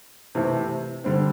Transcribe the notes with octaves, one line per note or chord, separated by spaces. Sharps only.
C3 E3 A3 C4 E4
D3 G3 C4